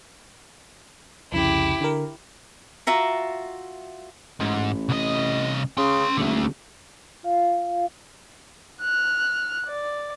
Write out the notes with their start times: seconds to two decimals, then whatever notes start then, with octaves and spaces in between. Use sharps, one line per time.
1.32 C2 F2 C#3 E4 G4
1.81 D3 A#4
2.87 F4 F#4 E5 A#5
4.40 A1 G#2
4.89 C2 D#5
5.78 C#3 C#4 C6
6.17 D#1 D3 A3
7.23 F4 F5
8.81 F6 F#6
9.66 D5